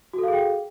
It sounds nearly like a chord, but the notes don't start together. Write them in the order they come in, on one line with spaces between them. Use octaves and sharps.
F#4 A4 F5 G#4 G5